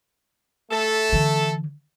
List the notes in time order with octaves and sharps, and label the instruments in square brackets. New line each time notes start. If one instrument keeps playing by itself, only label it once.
[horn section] A3 A4
[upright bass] D3 E3